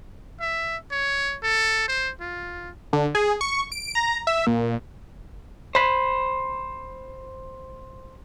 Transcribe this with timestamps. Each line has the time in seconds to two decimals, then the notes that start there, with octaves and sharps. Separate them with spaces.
0.41 E5
0.91 C#5
1.43 A4
1.88 C5
2.21 F4
2.93 D3
3.15 G#4
3.41 C#6
3.72 D7
3.95 A#5
4.27 E5
4.47 A#2
5.75 C5 B5